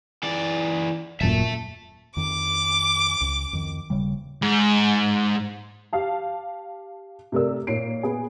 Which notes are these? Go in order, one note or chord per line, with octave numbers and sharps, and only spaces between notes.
E3 D5
D#1 F#2 A#2 E5 A5
F2 D#3 D6
C#2
F2 D#3
D#1 C#3 G3
G#2
G4 F5 A5
C3 A3 A#4 D5 E6
A#2 D#4 C#5 C7 D7
B3 G#4